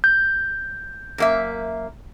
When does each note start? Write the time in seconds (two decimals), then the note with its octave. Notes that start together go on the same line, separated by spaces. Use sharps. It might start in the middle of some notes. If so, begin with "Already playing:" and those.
0.04 G6
1.18 F#2 A#3 E5